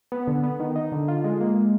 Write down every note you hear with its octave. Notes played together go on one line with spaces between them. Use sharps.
B3
D3
B3
D#3
D#4
D3
F4
G#3
A#3